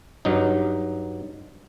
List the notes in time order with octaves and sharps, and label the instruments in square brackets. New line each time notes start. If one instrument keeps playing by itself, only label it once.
[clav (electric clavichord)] G2 F#3 D#4